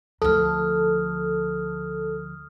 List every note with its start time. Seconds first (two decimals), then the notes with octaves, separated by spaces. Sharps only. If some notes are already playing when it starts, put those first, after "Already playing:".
0.22 D2 F3 A4 D#6 F6